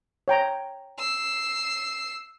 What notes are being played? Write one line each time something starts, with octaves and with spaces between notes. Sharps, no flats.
C#5 G5 A#5
E6 C7